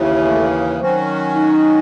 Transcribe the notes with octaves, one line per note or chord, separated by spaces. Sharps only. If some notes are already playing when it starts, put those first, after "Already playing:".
Already playing: D#2 C#3 E3
A3
D#3 F#3 C4 C#4 F#4
D#4